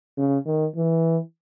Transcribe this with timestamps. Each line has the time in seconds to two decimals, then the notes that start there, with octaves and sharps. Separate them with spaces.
0.17 C#3
0.46 D#3
0.76 E3